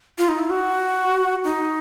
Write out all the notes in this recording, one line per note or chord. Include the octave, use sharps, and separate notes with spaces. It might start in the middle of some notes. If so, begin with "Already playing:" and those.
F4
D#4
E4
F#4
D#4